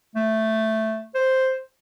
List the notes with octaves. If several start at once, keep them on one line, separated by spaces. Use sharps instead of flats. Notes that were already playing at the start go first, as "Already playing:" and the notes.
A3
C5